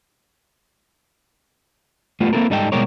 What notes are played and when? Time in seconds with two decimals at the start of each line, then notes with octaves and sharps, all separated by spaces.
2.20 G3 A3 B3 F4
2.33 A#3 C4 E4 F#4 A4 A#4
2.50 G#2 G3 D#4 A4 B4 G5
2.72 B2 G3 G#3 G4 A#4 C#5